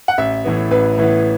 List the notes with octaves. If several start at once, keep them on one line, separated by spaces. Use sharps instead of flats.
F#5
A1 E5
A2 E3 B3
A1 B4
A2 E3 B3